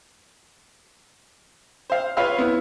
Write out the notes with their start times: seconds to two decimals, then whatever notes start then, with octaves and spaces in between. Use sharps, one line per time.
1.90 C5 F5
2.17 F4 B4 C#5 F5 C6 F6
2.38 B3 E4